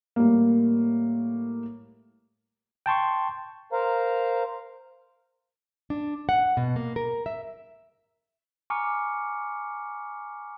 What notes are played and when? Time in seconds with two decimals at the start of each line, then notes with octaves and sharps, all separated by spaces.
0.16 A2 G3 A#3
2.86 G5 A5 C6 C#6
3.73 A#4 C5 F5 A#5
5.90 D4
6.29 F#5
6.57 B2
6.76 A#3
6.96 A#4
7.26 E5
8.70 G#5 A#5 C#6 D6 F6 C#7